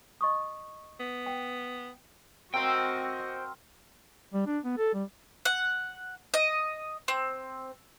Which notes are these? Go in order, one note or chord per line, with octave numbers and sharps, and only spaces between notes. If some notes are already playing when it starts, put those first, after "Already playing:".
D#5 C#6 D#6
B3
G5
C4 F#4 A#4 C5 D#5 F5 G5
G3
D4
B3
A4
G3
F#5
D#5
C4